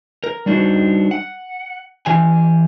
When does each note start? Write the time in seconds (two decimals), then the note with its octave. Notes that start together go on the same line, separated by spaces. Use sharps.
0.24 A#4
0.46 G3 D4 D#4 F#4 C5
1.11 F#5
2.06 E3 G4 G#5